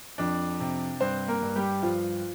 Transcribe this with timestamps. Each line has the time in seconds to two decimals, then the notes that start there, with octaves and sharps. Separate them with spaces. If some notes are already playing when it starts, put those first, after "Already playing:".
0.18 F2 D4
0.60 C3
1.00 G2 C4 C5
1.28 A#3 A#4
1.42 G2
1.56 G3 G4
1.82 G2 F3 F4